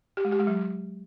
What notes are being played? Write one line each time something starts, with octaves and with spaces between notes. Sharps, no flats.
G4
G#3
G4
G#3
F#3